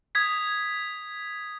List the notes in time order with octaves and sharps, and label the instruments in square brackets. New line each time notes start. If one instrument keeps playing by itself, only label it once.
[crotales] D#6 G#6 B6